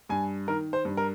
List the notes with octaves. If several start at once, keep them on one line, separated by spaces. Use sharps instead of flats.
G2 G#5
D#3 A#4
C5
G2
A#4